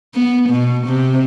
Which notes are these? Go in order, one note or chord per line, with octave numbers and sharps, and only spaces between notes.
B3
B2
C3